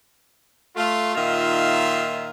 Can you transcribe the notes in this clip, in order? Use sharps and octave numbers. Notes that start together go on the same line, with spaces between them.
A3 F4
A#2 D#3 D#4 F4 E5 C6